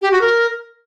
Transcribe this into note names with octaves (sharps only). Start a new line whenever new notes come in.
G4
F#4
A#4